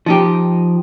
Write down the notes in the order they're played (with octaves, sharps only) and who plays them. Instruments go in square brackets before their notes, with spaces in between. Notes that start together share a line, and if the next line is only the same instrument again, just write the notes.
[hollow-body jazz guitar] F3 D#4 G4